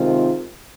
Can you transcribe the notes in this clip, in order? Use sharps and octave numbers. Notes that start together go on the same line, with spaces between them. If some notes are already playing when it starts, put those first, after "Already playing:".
Already playing: C3 D#3 G#3 C4 F4